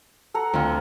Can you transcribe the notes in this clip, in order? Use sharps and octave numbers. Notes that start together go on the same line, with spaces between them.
A4 F#5 A#5
D2 C4 F4